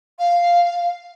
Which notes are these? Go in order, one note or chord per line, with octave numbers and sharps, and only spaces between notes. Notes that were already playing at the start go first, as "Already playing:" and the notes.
F5